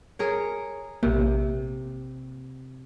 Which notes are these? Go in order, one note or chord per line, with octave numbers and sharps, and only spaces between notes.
G#4 A#4 C#5
A#1 C3 A#3